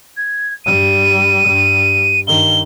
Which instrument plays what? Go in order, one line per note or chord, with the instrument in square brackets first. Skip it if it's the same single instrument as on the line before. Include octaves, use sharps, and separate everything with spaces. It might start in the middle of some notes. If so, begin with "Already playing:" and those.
[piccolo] G#6
[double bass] G2 G3 [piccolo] D#7
[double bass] G2 G3
[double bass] G2 D#3 [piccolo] G7